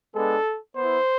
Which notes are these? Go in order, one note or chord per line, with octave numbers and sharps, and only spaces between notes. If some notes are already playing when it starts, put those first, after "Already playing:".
G#3 B3 D4 A4
B3 E4 C5